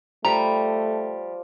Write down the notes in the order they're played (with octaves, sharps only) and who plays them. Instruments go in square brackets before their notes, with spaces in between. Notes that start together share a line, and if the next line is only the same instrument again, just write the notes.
[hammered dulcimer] F3 [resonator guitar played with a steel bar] G3 [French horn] A3 [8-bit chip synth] A#5